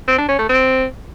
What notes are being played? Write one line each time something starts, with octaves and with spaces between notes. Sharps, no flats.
C4
D4
C#4
A3
C4